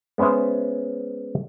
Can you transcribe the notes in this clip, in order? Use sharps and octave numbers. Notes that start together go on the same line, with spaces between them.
G#3 B3 C#4 C5 E5